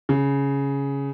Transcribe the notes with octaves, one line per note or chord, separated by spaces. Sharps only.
C#3